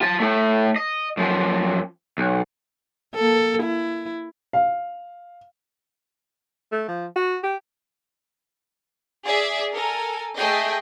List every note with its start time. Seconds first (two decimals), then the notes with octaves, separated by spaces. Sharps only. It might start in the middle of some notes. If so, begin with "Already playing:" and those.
0.01 F4 A5
0.20 A3 E4
0.76 D#5
1.17 F#2 F3
2.18 B1
3.15 A#3 A4
3.62 E4
4.53 F5
6.72 A3
6.88 F3
7.16 F#4
7.43 G4
9.25 G#4 D5 E5
9.73 A4 A#4 G#5
10.36 A3 G#4 D#5 G5